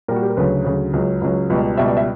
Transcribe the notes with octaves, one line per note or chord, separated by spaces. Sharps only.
A#2 G3 A#4
F#4
G4
A#4
D2 C#3 F#3 B4
D2 C#3 F#3 C#5
C#2 C#3 F#3
C#2 C#3 F#3
C#2 B2 G3
C#2 B2 G3 E5
D5
E5